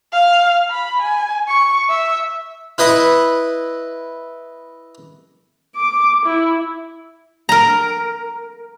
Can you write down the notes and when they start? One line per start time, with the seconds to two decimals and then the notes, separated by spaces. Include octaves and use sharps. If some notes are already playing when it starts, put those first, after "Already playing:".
0.13 F5
0.71 B5
1.02 G#5
1.48 C#6
1.90 E5
2.78 E4 B4 D#5 B5
5.76 D6
6.26 E4
7.49 A#4 A#5